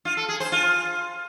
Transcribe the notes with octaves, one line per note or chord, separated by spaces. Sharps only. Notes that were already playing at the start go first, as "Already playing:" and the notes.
F4
A4
G#4
C5
F4